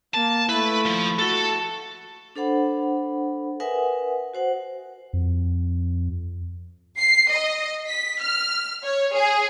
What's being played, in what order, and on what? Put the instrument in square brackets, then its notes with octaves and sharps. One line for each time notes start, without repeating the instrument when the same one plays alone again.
[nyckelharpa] A#3 [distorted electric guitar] A5
[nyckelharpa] A3 E4 [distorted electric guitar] B4
[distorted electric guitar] F3
[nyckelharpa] F#4 A5 [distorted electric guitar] A4
[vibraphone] D4 A4 C5 F#5 B5
A#4 B4 E5 F#5 G#5 D#6
F#4 C5 F#5
[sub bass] F2
[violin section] C7
D#5
B6
F6
C#5
G#4